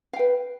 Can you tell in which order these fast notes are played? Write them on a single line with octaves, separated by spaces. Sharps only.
F5 G5 B4